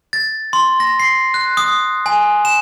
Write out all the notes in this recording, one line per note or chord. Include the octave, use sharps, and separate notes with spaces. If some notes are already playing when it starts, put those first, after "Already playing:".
A6
C6
A#6
C7
F#6
D#6
G#5
E7